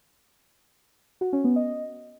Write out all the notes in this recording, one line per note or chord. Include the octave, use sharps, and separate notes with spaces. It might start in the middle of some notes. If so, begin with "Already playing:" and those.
F#4
C#4
B3
D#5